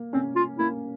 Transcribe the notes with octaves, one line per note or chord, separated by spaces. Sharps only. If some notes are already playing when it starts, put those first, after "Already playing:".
Already playing: A#3
C4 C#4
F4
A#3 E4